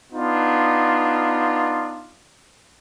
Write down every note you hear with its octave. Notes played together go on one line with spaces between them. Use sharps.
B3 D4 D#4 F4